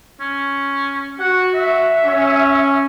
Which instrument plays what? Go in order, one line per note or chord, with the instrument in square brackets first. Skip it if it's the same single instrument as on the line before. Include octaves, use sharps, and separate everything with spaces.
[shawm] C#4
[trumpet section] F#4 [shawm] F#5
[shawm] E5
[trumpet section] C#4